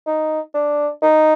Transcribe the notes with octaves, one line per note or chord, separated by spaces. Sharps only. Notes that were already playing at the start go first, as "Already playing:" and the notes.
D#4
D4
D#4